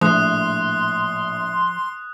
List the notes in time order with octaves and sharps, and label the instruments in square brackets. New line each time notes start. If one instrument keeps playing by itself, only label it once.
[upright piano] A#1 A2 [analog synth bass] F3 [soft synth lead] C6 [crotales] D#6 F#6